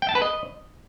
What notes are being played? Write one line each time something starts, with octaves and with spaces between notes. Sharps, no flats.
G5
A5
B4
D#5